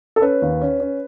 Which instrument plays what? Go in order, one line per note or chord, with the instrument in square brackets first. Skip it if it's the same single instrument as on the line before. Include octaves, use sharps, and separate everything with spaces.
[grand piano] A4
C#4 B4
D#2
C#4
C#4